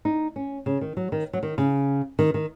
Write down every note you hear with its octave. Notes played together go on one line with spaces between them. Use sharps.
D#4
C#4
C#3
D#3
F#3
D#3
F#3
D#3
C#3
D#3
D#3